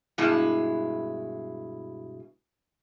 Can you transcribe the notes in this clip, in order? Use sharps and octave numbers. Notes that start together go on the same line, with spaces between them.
G2 B2 G#3 E4